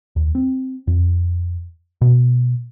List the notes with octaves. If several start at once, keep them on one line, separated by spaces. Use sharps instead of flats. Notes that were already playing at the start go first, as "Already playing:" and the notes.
D#2
C4
F2
B2